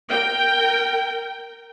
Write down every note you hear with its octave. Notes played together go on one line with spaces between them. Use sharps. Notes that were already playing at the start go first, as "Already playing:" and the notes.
A#4 G5